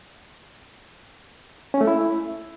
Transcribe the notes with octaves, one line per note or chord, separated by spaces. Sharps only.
C#4
A3
E4